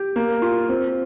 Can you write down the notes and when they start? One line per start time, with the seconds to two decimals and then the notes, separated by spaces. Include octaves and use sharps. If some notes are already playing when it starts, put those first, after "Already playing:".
Already playing: G4
0.16 A#3
0.42 F4
0.69 C4